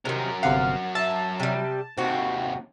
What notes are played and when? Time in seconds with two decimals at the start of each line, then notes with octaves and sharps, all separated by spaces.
0.05 C3 D#3 F#3 A#4
0.43 G1 C3 F5 F#5
0.95 E5 A5
1.40 C3 G3
1.98 D#2 C3 C4 F#4